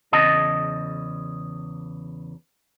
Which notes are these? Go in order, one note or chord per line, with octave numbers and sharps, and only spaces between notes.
E2 C#3 D#5 A5